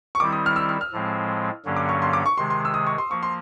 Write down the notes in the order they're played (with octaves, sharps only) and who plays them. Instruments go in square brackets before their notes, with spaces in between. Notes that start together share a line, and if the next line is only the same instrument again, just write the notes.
[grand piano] C#6
[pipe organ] D#3 G3 C4 E4 [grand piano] D6
[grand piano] D#6
F6
E6
F6
F6
[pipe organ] A2 F3 G#3 C4
G2 D3 F#3 A#3 C#4
[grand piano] D6
C#6
C6
D6
C#6
[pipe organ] C3 D#3 G#3 [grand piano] C6
[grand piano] C6
E6
D#6
C#6
C6
[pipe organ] F3 A#3 [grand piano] C#6
[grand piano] C6